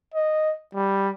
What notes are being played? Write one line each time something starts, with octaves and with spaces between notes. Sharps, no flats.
D#5
G3